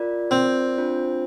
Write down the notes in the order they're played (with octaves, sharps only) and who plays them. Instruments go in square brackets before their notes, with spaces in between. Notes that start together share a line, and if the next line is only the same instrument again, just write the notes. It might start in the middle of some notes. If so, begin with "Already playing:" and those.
Already playing: [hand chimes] F4 A#4 D5
[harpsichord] C4
[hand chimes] D4 F4 C5